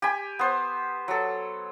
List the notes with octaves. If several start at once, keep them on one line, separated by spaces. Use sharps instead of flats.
G4 G#5 B5
B3 C5
F#3 A4